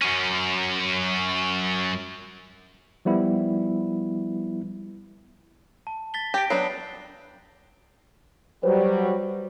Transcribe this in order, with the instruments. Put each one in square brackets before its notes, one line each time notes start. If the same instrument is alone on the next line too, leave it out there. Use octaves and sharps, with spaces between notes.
[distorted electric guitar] F#2 C#4
[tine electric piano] F3 G3 B3 E4
[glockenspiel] A5
A6 B6 G7
[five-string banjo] G4 [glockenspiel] A#6 D7
[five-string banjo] F#3 B3 D4 [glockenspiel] C7
[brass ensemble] F#3 G3 [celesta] B4 C5